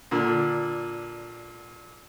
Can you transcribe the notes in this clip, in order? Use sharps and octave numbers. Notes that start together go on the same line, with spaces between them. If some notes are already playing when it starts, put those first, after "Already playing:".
A#2 D3